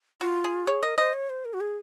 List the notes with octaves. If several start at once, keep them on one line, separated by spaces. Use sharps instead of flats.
F4 F#4
G#4
G#4 C#5
A#4 D#5
C5 D#5
C#5
C5
A#4
F#4
G#4